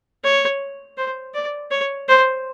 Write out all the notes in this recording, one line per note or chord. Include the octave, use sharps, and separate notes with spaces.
C#5
C5
D5
C#5
C5